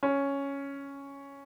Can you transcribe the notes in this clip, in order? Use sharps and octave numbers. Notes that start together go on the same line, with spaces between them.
C#4